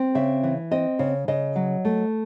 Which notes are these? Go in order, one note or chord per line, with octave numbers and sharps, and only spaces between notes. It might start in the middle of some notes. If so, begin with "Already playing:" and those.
Already playing: C4
C#3 E5
E3
C4 D#5
C#3
C#3 D#5
F#3
A3